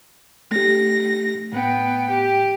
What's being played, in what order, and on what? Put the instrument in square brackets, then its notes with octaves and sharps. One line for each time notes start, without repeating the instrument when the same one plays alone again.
[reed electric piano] A3 G4 [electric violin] A#6
[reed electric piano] A2 [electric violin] B3 G5
[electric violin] G4